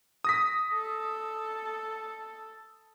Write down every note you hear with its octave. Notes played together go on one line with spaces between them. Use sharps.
D#6 A#6 B6
A4